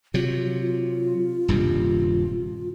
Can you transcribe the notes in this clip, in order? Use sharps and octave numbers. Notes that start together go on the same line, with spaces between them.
C3 F#3 F4
D#1 G2 C3